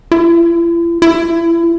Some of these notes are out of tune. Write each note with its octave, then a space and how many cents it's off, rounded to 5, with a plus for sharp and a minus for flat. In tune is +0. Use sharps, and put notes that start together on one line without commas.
E4 +45
E4 +30